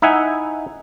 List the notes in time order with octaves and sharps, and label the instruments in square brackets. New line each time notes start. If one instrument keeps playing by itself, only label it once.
[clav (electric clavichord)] D#4 E4 E5 F#5 G#5